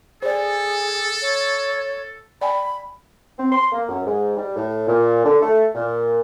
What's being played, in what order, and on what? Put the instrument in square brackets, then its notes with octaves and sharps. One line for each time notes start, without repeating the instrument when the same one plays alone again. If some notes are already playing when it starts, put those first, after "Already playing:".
[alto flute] G#4 [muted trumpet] A4 [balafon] C5 D5
[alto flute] C#5
[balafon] D5 G5 G#5 [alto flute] B5
[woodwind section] C4
C6
A#3
F#2
G#2
G3
A2
A#2
D3
A3
A#2